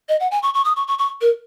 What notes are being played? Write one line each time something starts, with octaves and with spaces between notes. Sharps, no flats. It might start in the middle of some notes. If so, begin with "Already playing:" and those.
D#5
F#5
G#5
C#6
C#6
D#6
C#6
C#6
C#6
A#4